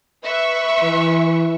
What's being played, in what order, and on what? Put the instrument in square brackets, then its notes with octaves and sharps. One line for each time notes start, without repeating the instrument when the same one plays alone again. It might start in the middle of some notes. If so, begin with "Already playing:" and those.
[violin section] B4 E5 C#6
[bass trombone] E3